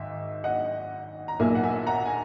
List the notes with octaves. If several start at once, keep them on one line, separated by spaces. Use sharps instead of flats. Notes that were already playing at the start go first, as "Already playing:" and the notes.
Already playing: G#1 G#2 E5
D#5 F#5
A#5
B1 A#2 A#3 E5 G#5
F#5
E5 G#5
F#5 A#5
G#5